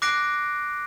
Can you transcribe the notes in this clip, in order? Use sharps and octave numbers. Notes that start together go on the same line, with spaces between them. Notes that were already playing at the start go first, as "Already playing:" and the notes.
D6 F#6 A#6 C7 D7